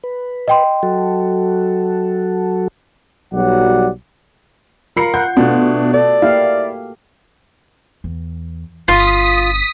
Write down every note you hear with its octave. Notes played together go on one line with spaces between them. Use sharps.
B4
D#5 G5 C6
F#3 F#4 A4
B1 F#3 G3 D5 F#5
F4 A#4 B5 C7 C#7
F#5 G6
B2 A3 D4 F4 F#4
A4 D5
A#3 E4 G4 F5
E2
G1 D4 F4 D#6 B6